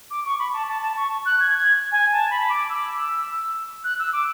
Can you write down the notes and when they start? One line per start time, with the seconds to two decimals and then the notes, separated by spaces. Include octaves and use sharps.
0.11 D6
0.25 C#6
0.39 B5
0.53 A5
0.69 A5
0.83 A5
0.97 C#6
1.26 F#6
1.40 G#6
1.55 G#6
1.92 G#5
2.12 A5
2.31 B5
2.50 D6
2.70 E6
3.84 F#6
3.99 E6
4.13 D6